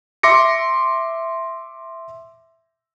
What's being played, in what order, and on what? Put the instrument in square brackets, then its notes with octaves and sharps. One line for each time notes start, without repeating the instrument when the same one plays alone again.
[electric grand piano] E5 C6 D6 A#6 C#7